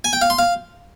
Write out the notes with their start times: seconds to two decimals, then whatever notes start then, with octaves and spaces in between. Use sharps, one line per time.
0.04 G#5
0.13 G5
0.21 F5
0.30 C6
0.39 F5